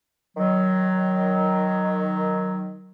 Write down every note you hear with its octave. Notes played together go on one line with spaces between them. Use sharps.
D#3 F#3